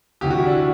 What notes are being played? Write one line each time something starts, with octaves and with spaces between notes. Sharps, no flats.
D2 C3 E3 G4
F#4
E4
D4